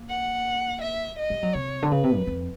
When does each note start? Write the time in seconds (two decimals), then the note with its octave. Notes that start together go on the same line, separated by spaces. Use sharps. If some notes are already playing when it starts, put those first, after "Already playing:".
Already playing: A#3
0.09 F#5
0.81 E5
1.19 D#5
1.30 G3
1.43 F#3
1.54 C3 C#5
1.82 D3
1.91 C#3 B4
2.03 C3
2.16 F#2
2.27 F2